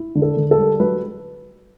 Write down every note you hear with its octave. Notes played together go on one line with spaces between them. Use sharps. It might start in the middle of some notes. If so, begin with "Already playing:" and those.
Already playing: E4
D3
A4
D3
A4
G3
F#3 B4